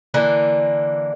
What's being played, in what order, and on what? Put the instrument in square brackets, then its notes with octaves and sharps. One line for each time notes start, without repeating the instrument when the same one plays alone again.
[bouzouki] D3 E3 A#3